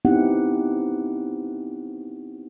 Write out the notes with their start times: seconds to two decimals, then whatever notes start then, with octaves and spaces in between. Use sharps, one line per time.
0.05 B3 C4 D#4 E4 G4 F#5